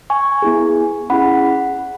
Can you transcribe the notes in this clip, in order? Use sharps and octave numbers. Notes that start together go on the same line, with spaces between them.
G#5 C#6
B3 E4 G#4
C#4 E4 G#4 F#5 B5